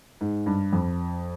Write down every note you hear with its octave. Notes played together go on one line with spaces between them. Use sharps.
G#2
G2
F2